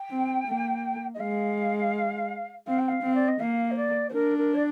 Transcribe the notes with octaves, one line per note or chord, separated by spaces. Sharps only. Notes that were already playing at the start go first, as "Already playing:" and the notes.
Already playing: G5
C4
A#3
D#5
G#3 F5
C4 F5
G5
F5
C4
D5
D#5
A#3 F5
C5
D5
C5
D4 A#4
A#4
D5